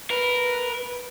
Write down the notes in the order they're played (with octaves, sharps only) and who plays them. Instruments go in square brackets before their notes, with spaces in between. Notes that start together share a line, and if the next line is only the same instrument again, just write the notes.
[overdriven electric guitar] A#4 [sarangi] B4